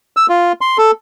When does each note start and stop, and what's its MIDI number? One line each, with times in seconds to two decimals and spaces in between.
0.17 0.26 88
0.29 0.52 65
0.61 0.77 84
0.78 0.91 69